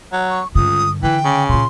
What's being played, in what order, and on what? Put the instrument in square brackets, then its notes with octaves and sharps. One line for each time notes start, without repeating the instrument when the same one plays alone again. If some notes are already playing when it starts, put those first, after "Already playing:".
[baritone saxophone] F#3
[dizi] C#6
[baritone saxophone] C#2 [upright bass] G2 D3 [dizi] D#6
[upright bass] D3 [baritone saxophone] E3 [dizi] G5
[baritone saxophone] C#3
[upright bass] A#2 F4 [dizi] C6